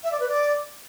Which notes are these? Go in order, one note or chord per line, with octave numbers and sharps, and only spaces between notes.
E5
D5
B4
D5